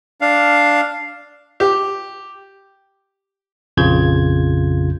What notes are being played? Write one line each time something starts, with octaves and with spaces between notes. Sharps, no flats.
D4 F5
G4
A#1 F2 C#3 F4 G6 G#6